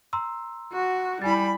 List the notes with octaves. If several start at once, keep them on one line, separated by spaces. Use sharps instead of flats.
A#5 C6 E6
F#4
G3 E4 G#5 B5 A6